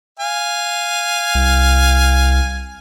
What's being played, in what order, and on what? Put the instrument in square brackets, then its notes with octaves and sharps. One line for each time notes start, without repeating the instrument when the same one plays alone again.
[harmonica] F5 G#5
[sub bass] C2